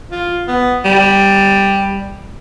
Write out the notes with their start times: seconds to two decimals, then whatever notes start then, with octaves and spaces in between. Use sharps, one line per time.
0.11 F4
0.48 B3
0.84 G3